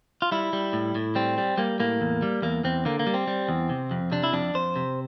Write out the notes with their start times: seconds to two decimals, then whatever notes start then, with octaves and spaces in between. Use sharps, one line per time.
0.22 F4
0.31 G3 E4
0.53 G3
0.73 A2
0.95 A2
1.15 G3 C4
1.38 G3
1.58 G3 A#3
1.80 A2 A#3
2.01 E2
2.22 G3
2.42 E2 A#3
2.64 E2 C4
2.85 D3 A#3
2.99 A#3
3.07 G3
3.14 C4
3.27 G3
3.49 E2
3.69 C3
3.91 F2
4.12 C3 D4
4.24 E4
4.33 F2 D4
4.54 F2 C5
4.76 C3